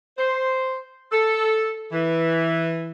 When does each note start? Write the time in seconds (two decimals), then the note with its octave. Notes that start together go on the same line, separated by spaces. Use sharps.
0.18 C5
1.12 A4
1.92 E3